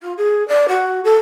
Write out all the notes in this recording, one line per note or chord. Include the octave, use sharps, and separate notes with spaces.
F4
G#4
D5
F#4
A4